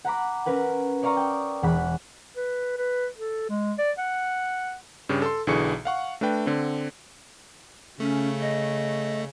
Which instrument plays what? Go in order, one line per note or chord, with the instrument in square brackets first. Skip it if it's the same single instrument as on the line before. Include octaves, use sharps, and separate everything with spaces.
[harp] F#5 A#5 B5 D6
C#4 A#4 B4 F#5
C#5 D5 F5 A#5 C#6 D#6
G5
E1 E3 F#5 B5 F#6
[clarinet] B4
B4
A4
G#3
D5
F#5
[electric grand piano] G2 C#3 G4
A4 C6
B1 D3 E3 G#4 C#6 C#7
F5 F#5 C#6
A3 D4 B4 G5
D3 C4
[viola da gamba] C#3 [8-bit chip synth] A3 [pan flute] C#4
[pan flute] D#5